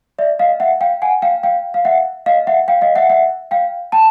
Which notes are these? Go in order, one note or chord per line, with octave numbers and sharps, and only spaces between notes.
D5 E5
D#5 F5
E5 F#5
F5 G5
F#5 G#5
F5 G5
F5 G5
F5
E5 F#5
D#5 F5
E5 F#5
F5 G5
D#5 F5
E5 F#5
E5 F#5
F5 G5
G5 A5